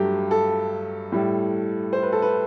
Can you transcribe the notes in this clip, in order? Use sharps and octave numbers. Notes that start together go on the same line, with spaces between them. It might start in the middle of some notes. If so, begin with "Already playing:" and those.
Already playing: G2 F#3 A3 G4
A4
A2 G3
C5
B4
A4
B4